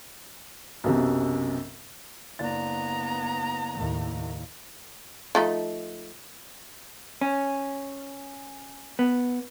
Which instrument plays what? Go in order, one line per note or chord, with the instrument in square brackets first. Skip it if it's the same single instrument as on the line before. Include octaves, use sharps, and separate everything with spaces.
[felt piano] B1 F#2 C3
[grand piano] F#1 D4 A6 [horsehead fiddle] B3 A#5
[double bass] D#2 A2
[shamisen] F3 A3 D#4
[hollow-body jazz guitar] C#4
B3